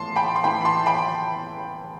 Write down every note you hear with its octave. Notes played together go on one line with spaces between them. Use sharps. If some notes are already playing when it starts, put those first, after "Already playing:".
Already playing: A2 E3 A5 C6
G5 B5
C6
A2 E3 G5 B5
B5
A5 C6
G5 B5